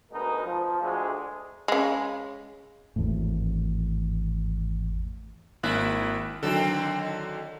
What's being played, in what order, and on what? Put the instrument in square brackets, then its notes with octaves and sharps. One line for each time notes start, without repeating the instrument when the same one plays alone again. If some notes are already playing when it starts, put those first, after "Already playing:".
[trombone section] D2 B2 G#3 B3 D#4 A#4
F3
D2 G#3
[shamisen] C#3 G#3
[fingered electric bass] G#1 E2 A2
[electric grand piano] G#1 A#3 F#6 [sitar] E4
[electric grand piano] D3 F#3 [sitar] D#3 C4 A4